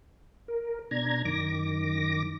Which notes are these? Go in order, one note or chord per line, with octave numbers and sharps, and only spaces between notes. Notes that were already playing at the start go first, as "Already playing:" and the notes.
A#4
B2 D4 A#5 G#6
F#2 D#3 D6 A#6